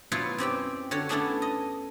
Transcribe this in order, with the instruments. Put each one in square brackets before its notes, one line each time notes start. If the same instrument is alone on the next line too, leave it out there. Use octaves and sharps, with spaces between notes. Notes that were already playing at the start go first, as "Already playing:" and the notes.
[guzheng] B2 F#3 B3 E4 F4 B4
F#2 C4 G4 G5
D3 F#4 C#5
A3 B3 C#4 D4 E4 A4
D#5